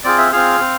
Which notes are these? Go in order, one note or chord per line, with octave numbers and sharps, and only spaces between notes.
C4 F4 G#4 D5
E5
C4 F4 G#4 F5
C4